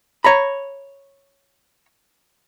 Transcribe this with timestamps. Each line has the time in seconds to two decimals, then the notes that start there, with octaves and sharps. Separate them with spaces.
0.24 C#5 A#5 B5